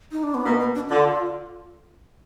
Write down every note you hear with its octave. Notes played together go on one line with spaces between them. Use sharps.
D#4
D4
B3
B2 A#3
B3
D4
D3 F4